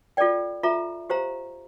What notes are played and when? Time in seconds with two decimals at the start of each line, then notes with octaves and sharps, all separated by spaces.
0.17 F4 A4 D5 G5
0.63 F4 A4 E5 A#5
1.10 G4 C5 F5 A#5